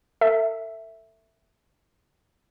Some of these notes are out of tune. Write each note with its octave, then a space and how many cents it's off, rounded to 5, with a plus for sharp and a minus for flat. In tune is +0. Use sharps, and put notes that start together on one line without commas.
A4 +35 E5 +0